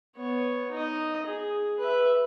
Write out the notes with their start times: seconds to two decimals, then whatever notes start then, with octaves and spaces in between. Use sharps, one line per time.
0.17 B3 C#5
0.71 D#4 D#5
1.27 G#4
1.79 B4 E5